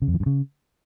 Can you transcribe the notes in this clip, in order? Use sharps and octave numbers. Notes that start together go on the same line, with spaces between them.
C#3
F2
E3
G2
C#3